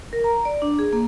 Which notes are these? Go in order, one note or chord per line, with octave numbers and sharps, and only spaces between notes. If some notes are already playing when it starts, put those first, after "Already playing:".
A#4
A#5
D5
D4
G#4
A#3